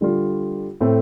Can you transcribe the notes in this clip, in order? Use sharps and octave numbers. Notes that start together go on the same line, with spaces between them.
D3 G3 F4
A2 A3 C4 A4